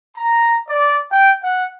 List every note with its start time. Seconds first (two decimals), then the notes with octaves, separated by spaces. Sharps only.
0.15 A#5
0.67 D5
1.11 G5
1.42 F#5